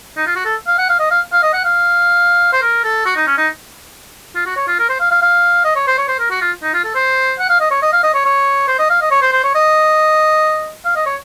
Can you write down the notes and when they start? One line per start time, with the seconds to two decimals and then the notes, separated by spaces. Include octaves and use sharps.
0.17 D#4
0.27 F4
0.36 F#4
0.45 A4
0.67 F5
0.78 F#5
0.89 F5
0.99 D#5
1.11 F5
1.32 F5
1.43 D#5
1.54 F#5
1.65 F5
2.53 C5
2.62 A#4
2.84 A4
3.05 F#4
3.16 D#4
3.27 C#4
3.38 D#4
4.35 F4
4.46 F#4
4.57 C#5
4.68 F4
4.79 A#4
4.89 C5
5.00 F5
5.11 F5
5.22 F5
5.64 D#5
5.76 C#5
5.87 C5
5.98 C#5
6.08 C5
6.19 A#4
6.30 F#4
6.41 F4
6.63 D#4
6.74 F4
6.84 A4
6.95 C5
7.39 F#5
7.49 F5
7.60 D#5
7.71 C#5
7.82 D#5
7.93 F5
8.03 D#5
8.14 C#5
8.25 C#5
8.68 C5
8.79 D#5
8.90 F5
9.01 D#5
9.11 C#5
9.22 C5
9.33 C5
9.44 C#5
9.55 D#5
10.85 F5
10.96 D#5
11.06 C#5